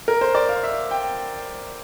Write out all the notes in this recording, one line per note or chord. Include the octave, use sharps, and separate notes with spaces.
A#4
C5
D5
F5
E5
G5